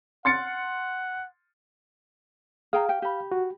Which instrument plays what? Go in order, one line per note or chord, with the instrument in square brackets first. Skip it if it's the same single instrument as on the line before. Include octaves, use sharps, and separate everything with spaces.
[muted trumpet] F#5 [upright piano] C6 A6 C#7
[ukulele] G#4 G5 A#5 [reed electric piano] F5
[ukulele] G4 G5
G4 B5
[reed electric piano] F#4